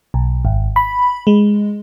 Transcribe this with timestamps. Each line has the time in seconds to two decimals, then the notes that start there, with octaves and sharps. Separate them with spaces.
0.14 B1
0.45 G#1
0.76 B5
1.27 G#3